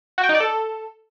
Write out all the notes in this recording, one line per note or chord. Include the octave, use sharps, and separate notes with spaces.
F#4
G5
D#4
D5
A4